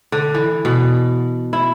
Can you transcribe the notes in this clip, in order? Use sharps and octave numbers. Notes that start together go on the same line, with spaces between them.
D3
E3
B2
E4